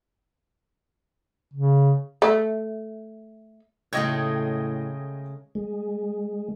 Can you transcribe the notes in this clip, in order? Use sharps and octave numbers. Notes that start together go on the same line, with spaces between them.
C#3
A3
A2 C#3 G#3 A3 D#5 G5 G#6
G#3